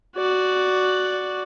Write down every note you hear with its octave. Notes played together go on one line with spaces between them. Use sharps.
F#4 D5